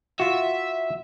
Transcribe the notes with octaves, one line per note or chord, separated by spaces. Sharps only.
F4 F#4 E5